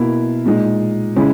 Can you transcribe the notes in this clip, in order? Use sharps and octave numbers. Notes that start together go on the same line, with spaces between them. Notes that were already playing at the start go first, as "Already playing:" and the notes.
Already playing: B2 A#3 E4
A#2 G#3 D#4
C#3 G#3 C#4 E4